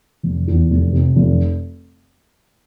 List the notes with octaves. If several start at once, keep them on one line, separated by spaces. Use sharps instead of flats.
F1
E2
F1
C3
F1